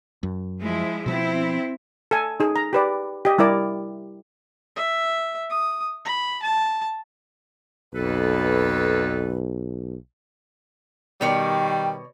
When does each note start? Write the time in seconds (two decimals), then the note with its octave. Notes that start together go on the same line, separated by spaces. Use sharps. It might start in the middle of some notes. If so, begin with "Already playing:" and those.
0.23 F#2
0.60 F3 G#3 E4
1.06 B2 F3 C4 E4
2.11 A4 G#5
2.40 D#4 G#4
2.56 A#5
2.73 G4 B4 D5
3.25 G4 D#5
3.38 G3 E4 A#4 D5
4.76 E5
5.50 D#6
6.05 B5
6.42 A5
7.94 B1 F2 A4 B4
11.21 B2 D#3 G3 C#5 D5 G5